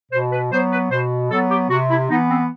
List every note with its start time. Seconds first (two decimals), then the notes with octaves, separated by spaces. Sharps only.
0.12 B2 C5
0.32 B4
0.52 F#3 B3 C5
0.71 B4
0.91 B2 C5
1.30 F#3 B3 A4
1.50 G4
1.70 C3 F#4
1.90 E4
2.09 E3 B3 D#4
2.30 C4